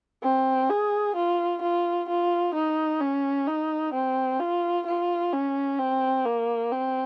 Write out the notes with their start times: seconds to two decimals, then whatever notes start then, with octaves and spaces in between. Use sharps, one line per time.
0.23 C4
0.70 G#4
1.16 F4
1.62 F4
2.09 F4
2.54 D#4
3.01 C#4
3.47 D#4
3.94 C4
4.40 F4
4.86 F4
5.33 C#4
5.79 C4
6.25 A#3
6.72 C4